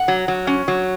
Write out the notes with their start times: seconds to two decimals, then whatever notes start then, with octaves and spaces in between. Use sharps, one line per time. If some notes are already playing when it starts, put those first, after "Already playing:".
Already playing: F#5
0.08 F#3
0.28 F#3
0.47 C#4
0.68 F#3